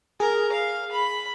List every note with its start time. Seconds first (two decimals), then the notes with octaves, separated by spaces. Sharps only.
0.20 G#4 A#4
0.52 F5
0.91 B5